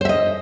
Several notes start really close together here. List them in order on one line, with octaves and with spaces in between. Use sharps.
C5 E5 D#5